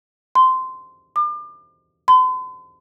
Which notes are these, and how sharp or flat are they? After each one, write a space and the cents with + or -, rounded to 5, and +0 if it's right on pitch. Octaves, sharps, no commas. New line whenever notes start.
C6 -15
D6 +40
C6 -45